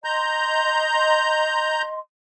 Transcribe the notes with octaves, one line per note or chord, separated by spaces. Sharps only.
D#5 A#5 C6 G6